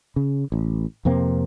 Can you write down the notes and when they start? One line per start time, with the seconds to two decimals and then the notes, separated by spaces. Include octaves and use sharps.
0.16 C#3
0.52 A1
1.05 F2 C3 A#3 C4